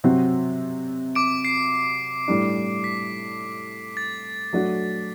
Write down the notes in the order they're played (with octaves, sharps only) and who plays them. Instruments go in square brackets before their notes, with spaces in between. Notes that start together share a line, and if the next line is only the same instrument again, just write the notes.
[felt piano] C3 F#3 C4 F#4
[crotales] D6 D7
C7
[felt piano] A2 G3 D4
[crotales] B6
A6
[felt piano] F#3 A3 D4 F#4